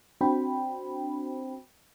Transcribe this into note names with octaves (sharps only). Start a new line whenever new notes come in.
C4 D4 F#4 C5 G5 B5